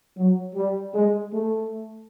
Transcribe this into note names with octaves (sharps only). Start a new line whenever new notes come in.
F#3
G3
G#3
A3